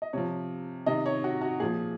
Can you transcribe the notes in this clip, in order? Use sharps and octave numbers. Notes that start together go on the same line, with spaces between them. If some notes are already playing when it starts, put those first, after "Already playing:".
D#5
C3 F3 C#5
C3 D#3 D#5
C#5
F#4
F#4
A#2 F3 G#4